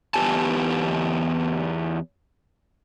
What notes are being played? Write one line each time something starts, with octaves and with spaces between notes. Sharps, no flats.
E2 B3 G4 G#5 A5